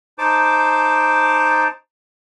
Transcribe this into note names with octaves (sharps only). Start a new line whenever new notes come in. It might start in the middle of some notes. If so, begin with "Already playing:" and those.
D#4 C5 A5 D6